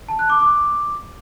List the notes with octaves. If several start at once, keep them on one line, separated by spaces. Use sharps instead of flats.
A5
F#6
D6
D6